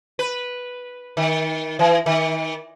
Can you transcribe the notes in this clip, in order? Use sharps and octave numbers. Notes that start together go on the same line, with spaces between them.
B4
D#3
E3
D#3